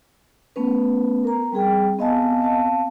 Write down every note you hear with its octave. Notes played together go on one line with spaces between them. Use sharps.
A3 B3 C#4 B4
A#4 A#5
G3 C4 G#4 G5
B3 C4 D#5 F5 G#5 A5
C4 F5 A5